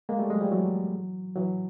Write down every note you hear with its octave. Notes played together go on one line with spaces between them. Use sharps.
G#3 A#3
G3 A3
F#3 G#3
F3 G3
E3 F#3
E3 F#3